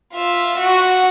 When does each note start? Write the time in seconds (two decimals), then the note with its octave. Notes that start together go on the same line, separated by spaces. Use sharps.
0.13 F4 E5
0.58 F#4